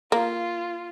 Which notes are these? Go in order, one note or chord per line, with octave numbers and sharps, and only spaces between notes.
A#3 F4